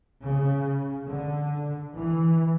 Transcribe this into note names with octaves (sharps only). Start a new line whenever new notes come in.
C#3
D3
E3